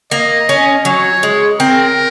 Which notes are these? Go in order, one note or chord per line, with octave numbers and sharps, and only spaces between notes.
A#3 D#5
C#4
F#3 C#5
G#3
C4 A#4